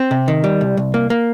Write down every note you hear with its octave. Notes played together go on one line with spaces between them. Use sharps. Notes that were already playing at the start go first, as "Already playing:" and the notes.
Already playing: C4
C3
D#3
G3
C2
C2
A#3
A#3